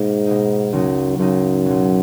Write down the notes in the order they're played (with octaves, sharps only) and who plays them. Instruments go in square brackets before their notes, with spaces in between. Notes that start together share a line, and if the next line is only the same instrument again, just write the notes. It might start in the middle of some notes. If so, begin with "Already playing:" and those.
Already playing: [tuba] G#2 [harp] B2 A#3 D#4
[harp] B2 A#3 D#4
[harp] C#2 C#3 F#3 A#3 D#4 [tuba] F#2
[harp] C#2 C#3 F#3 A#3 D#4 [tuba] F#2
[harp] C#2 B2 F#3